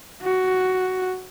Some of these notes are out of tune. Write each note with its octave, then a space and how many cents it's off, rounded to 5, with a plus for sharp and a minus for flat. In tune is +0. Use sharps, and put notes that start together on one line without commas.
F#4 +5